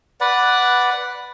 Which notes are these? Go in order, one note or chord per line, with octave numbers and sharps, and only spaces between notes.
B4 D5 F#5